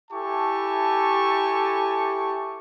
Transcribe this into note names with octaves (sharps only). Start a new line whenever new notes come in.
E4 G4 A4 G#5 A5 C#6